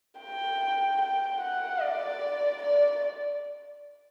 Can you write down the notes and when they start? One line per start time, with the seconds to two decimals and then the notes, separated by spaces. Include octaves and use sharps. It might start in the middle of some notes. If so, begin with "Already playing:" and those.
0.20 G5
1.01 G5
1.41 F#5
1.82 D5
2.63 D5